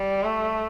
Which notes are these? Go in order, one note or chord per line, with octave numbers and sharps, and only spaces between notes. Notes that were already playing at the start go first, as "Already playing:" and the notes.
Already playing: G3
A3